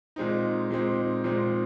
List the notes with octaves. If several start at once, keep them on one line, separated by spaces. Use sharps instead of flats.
A#2 G#3 C4 D#4
A#2 G#3 C4 D#4
A#2 G#3 C4 D#4